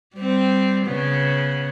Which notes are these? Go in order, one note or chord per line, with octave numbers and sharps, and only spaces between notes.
G3 C4
C#3 B3